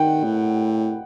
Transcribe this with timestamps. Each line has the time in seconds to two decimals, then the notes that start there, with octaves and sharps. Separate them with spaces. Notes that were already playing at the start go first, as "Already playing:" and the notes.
Already playing: D#3 F#5 G5
0.24 A2